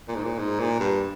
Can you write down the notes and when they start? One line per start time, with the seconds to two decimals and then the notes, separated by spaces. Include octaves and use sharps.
0.08 A#2
0.16 G#2
0.24 A#2
0.39 G#2
0.60 A#2
0.80 G2